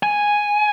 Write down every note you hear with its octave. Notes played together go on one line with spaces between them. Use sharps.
G#5